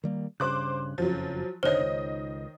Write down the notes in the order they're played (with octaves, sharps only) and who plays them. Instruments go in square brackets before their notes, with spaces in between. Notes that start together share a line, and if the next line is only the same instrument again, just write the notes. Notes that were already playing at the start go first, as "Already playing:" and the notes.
[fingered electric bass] D#3 G3 A#3
[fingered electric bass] G2 C#3 [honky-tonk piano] C5 D6 F#6
[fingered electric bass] F#1 F2 C#3 [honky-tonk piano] F3 F#3
[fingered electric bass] F1 A#2 D3 [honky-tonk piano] D#3 D#5 [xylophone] C5 C#5
[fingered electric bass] C#2